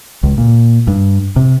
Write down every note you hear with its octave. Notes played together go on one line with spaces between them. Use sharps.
C#2
A#2
G2
C3